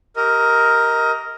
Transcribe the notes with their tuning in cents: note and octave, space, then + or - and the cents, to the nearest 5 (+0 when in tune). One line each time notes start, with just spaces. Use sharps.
G4 -5 A#4 +0 D#5 +25